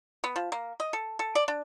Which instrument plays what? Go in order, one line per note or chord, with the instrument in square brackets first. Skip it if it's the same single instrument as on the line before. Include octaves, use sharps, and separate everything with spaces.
[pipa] B3
F3
A#3
D#5
A4
A4
D5
D4